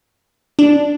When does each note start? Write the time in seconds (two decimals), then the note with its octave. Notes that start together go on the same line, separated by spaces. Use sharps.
0.59 D4